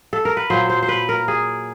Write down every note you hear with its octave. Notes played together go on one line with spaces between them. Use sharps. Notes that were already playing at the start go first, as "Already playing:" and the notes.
A4
A#4
B4
A#2 F#3 C5
C5
C5
B4
A#4
G#4